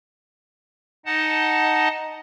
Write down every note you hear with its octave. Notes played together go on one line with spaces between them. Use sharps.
D#4 D#5 F#5 A5